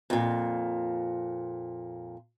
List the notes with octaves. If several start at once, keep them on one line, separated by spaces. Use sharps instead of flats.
F2 A#2